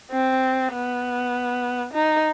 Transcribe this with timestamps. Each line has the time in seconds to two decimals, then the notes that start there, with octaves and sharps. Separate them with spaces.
0.12 C4
0.73 B3
1.93 D#4